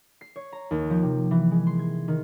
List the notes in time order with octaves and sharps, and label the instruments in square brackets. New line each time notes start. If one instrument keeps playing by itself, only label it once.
[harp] C7
C#5
A#5
D#2
F3
C3
E3
G#3
C6
G#6
D#3